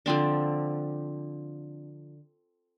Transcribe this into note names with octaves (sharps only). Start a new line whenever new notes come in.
D3 F3 C4 D4